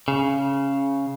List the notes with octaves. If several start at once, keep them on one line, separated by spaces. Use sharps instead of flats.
C#3